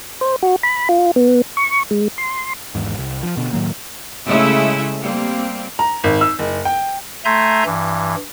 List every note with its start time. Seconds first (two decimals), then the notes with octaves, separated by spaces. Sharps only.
0.21 C5
0.43 F#4
0.63 B5
0.89 F4
1.16 B3
1.57 C#6
1.91 G#3
2.18 C6
2.75 G#1 E2 G#2
2.98 C2
3.23 F3
3.37 B2 D3
3.53 A2 D#3 F#3 A#3
4.28 C#3 G#3 A3 E4 E5
5.01 G3 A#3 C4
5.79 A#5
6.04 G#1
6.21 E6
6.39 F#1
6.65 G5
7.25 A3 E5 G#5 A#5 C6 G6
7.65 G2 E3